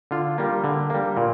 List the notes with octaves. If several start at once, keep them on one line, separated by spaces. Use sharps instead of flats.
D3 F4
G3 A#3
D3
G3 A#3
A#2